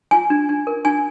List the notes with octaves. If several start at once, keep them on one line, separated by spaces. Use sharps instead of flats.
F4 G#5
D4
D4
A#4
D4 G#5